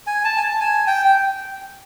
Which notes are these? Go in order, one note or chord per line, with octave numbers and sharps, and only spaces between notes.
G#5
A5
G#5
A5
G#5
G5
G5